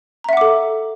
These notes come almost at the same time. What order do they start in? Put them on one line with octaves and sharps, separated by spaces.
A#5 E5 F#5 D6 A4